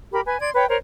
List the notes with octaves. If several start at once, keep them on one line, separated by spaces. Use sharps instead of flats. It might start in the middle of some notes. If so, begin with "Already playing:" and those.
G4 A#4 B5
B4 G#5
D5 C6 G#6
B4 C#5 G5
A#4 C5 C#5